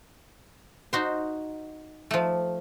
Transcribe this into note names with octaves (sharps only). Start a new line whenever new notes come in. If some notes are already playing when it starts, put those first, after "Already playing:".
D#4 F#4 C5
F3 A3